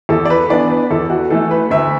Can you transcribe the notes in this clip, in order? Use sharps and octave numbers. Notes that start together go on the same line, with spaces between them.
E2 A4
D5
B4
E3 B3 D4 D5
B4
E2 A4
F#4
E3 A3 A4
B4
D2 E5